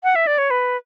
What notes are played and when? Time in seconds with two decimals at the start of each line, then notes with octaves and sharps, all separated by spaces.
0.03 F#5
0.15 E5
0.27 D5
0.38 C#5
0.50 B4